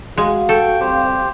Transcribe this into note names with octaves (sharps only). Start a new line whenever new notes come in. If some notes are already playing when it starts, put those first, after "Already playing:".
G#3 F#4 F5
A4 G5 C#6
D2 G3 C4 G4 C5